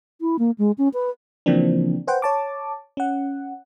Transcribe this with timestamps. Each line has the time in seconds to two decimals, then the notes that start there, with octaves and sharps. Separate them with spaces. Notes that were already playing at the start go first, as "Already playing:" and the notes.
0.21 E4
0.39 A#3
0.58 G#3
0.78 C#4
0.93 B4
1.46 C#3 E3 F3 A#3 C4 D4
2.07 B4 C5 F#5 G5
2.22 C#5 A5 D6
2.97 C#4 F#5